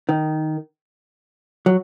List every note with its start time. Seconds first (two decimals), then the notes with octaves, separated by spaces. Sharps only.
0.09 D#3
1.66 F#3